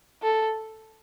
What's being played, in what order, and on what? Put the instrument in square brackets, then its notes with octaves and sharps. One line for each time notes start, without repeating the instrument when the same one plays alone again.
[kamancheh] A4